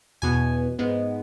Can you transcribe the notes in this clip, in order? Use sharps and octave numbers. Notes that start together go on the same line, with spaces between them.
E2 B2 B3 G#5
G#2 G#3 B3